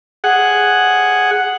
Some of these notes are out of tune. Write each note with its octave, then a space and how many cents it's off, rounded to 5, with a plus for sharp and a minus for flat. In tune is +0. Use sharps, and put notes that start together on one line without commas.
G#4 +0 F#5 +0